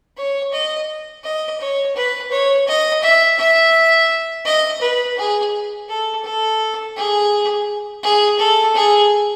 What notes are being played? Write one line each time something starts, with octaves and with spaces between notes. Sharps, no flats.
C#5
D#5
D#5
C#5
B4
C#5
D#5
E5
E5
D#5
B4
G#4
A4
A4
G#4
G#4
A4
G#4